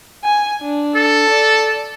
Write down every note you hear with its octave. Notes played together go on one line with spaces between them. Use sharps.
G#5
D4
A4
D5